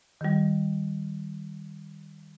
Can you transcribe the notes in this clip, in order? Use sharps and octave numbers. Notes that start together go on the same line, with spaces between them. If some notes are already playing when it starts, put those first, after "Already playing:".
D#3 G3